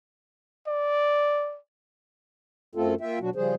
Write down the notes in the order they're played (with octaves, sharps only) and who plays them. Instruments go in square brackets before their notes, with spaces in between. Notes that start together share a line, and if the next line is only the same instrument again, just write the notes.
[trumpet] D5
[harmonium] F#2 A3 C4 F4 A4
A#3 F4 E5 G5
B2 F#3 D4 F#4
C#3 F3 G3 G#4 C5